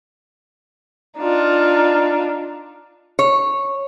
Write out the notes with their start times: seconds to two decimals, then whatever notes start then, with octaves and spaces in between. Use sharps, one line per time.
1.18 D4 D#4 F4
3.19 C#5